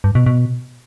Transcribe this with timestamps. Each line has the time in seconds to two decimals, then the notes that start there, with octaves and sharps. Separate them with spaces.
0.04 G2
0.15 B2
0.26 B2